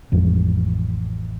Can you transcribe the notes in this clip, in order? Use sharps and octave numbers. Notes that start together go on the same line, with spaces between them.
A1 F2 F3 G#3